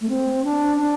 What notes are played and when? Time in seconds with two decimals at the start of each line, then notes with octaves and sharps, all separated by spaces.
0.01 A3
0.08 C4
0.44 D4
0.79 D4